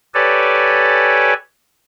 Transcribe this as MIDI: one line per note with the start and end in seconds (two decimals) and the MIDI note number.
0.14 1.33 67
0.14 1.33 69
0.14 1.33 71
0.14 1.33 73
0.14 1.33 74
0.14 1.33 80